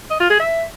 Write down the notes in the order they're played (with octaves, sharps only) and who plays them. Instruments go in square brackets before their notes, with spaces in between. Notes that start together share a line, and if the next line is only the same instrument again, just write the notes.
[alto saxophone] D#5
F4
G#4
E5